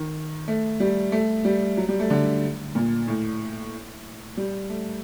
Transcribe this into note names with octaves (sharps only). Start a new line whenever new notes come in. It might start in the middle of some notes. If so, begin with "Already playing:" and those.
Already playing: D#3
A3
G3
A3
G3
F#3
G3
A3
D3
A#2
A2
G3
A3